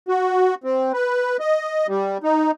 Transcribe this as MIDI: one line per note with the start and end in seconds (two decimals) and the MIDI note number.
0.08 0.55 66
0.64 0.92 60
0.93 1.37 71
1.40 1.87 75
1.88 2.18 55
2.23 2.51 63